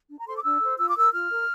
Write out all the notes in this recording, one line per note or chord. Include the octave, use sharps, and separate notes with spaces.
D4
A#5
A4 C5 C6
D6
D4 E6
A4 C5
F4 E6
D6
A#4 E6
F4 F6
A#4